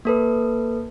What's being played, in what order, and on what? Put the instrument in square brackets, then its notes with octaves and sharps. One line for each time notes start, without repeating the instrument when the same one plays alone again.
[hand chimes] A#3 A4 B4